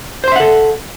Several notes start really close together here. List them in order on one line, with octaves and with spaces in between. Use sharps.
C5 C6 E5 F#5 A4